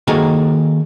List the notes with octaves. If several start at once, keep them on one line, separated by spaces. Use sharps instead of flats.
D#3 A#3 F#4 G#4 A4 G#5